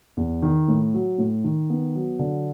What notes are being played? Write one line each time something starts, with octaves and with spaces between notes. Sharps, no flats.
E2
D#3
A2
F#3
A2
D#3
B3
F#3
D3